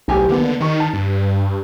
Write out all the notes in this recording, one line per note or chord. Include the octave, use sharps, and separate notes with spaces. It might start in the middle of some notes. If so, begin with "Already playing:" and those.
D1 B1 G4 G#5
D3 D#3 A#3 B3
D#3 D#4 C#6
A5
G2